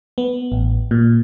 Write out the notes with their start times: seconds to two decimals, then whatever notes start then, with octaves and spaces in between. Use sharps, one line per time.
0.18 B3
0.52 A1
0.91 A#2